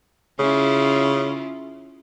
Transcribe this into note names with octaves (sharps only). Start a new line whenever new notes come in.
C#3 C#4 E4 F4